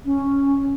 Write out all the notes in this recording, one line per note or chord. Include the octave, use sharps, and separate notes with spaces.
C#4